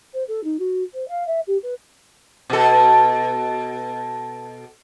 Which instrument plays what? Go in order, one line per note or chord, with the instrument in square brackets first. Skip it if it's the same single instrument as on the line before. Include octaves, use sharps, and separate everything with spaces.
[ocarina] C5
A4
D#4
F#4
C5
F5
E5
G4
B4
[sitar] B2 A4